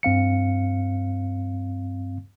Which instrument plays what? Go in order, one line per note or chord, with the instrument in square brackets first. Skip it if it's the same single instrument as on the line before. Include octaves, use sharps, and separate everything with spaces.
[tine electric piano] G2 C4 F5 C#7